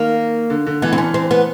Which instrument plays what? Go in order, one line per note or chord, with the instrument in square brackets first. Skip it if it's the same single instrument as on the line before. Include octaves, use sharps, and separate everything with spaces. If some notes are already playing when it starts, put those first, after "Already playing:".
Already playing: [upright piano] D#3 [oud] A#3
[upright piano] D3
D3
[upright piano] E3 [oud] B3
[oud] C4
C#4
C4
B3